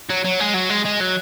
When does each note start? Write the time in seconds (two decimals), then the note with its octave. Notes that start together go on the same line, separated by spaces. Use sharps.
0.10 F#3
0.25 F#3
0.40 G#3
0.55 F#3
0.70 G#3
0.85 G#3
1.01 F#3